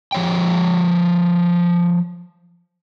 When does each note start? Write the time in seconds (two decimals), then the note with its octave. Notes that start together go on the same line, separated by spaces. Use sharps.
0.12 F3 C#5 G5